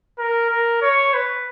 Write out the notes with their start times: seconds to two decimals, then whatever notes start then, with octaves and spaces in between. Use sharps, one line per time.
0.18 A#4
0.50 A#4
0.82 C#5
1.14 B4